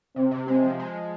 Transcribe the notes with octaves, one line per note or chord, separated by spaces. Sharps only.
C3 C4
C3
G#3 C4
F3
G#3